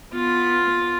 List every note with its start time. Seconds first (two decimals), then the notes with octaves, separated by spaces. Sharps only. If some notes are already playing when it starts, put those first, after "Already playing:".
0.13 B3 F4